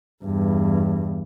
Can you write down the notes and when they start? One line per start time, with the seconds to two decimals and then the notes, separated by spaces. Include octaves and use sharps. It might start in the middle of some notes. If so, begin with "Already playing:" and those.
0.24 E2 G2